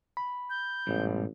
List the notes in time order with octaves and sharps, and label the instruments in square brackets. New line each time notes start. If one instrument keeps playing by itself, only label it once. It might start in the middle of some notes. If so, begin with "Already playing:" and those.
[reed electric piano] B5
[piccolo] G6
[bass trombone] A1 [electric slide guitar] G#2 B2 G3